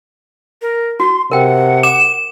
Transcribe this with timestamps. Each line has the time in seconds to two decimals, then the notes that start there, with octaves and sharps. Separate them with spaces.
0.62 A#4
1.00 F#4 C6
1.31 C3 A#4 F#5 G5
1.83 D6 E7